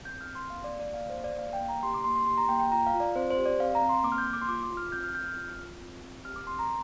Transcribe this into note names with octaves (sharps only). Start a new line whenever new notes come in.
C4 G6
F6
C4
C6
A#3 F5
D5
A#3
D5
A#3 F5
C5
A#3
D5
A#3 F5
G5
A#3
A#5
G4 C6
D6
A#3 C6
C6
G4 C6
A#5
A#3 G5
G5
F4 A#5
F5
F4
D5
C4 C5
C5
G4
D5
C4 F5
A#5
C4
C6
A#3 D6
F6
G6
A#3
D6
C6
F4 D6
D6
F4
F6
C4 G6
F6
C4 G6
F6
F4
F4
C4
C4
G4 F6
D6
C4 C6
A#5